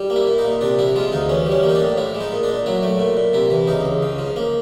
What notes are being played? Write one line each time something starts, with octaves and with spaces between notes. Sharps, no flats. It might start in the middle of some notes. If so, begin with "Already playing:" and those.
Already playing: G3
A#3
E4
A#2
D#4
A#2
C3 D4
F3 E4
G#3 F4
D2 D#4
E3 C#4
G3
C#4
A#3
D#4
D4
A2
F3 E4
G#3
D#4
A#2
D4
A#2
F#3 E4
A3
A#2
A#2
C3 E4
E3
C#2 D#4
C#2
C#3
F3
A#3